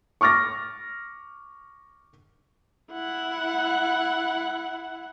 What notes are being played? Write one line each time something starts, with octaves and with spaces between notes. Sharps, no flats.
C#6 D6 F6 A6 A#6
E4 F#5